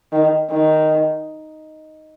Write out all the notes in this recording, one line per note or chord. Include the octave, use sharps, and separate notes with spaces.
D#3
D#3